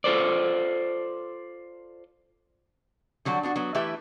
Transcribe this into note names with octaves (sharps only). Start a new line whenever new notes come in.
F4 A4 C5 D5
D3 F#3 G3 F#4
B3 D4 F#4
F#3 B3
E3 A3 E4 G4 B4 E5